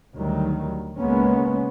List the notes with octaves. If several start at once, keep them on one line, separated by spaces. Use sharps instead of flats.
D2 D#3 F#3 G3
C#2 G#3 A#3 B3 C#4